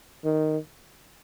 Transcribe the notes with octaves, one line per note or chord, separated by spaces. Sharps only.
D#3